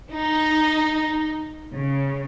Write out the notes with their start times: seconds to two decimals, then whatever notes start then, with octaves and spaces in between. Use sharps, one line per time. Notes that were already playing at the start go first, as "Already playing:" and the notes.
0.11 D#4
1.73 C#3